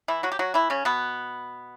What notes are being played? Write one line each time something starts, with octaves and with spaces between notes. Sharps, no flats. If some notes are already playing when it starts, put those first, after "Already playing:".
E3 E4
F#3 F#4
G4
F#3 F#4
E3 E4
C#3 C#4
B2 B3